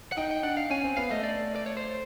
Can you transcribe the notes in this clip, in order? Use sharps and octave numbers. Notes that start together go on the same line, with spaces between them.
F#5
D#4 G5
G5
D4 F#5
F5
C#4 G#5
C4
B3 F5
A3 D#5
D5
D5
C#5
C5